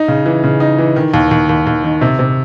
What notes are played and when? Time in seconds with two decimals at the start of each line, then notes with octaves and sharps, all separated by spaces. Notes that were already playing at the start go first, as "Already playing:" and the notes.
Already playing: D#4
0.08 C#3
0.26 E3
0.44 C#3
0.60 D#4
0.78 E3
0.96 D#3
1.14 D#2
1.31 D#2
1.49 D#2
1.67 D#2
1.84 D#3
2.01 C3
2.19 C3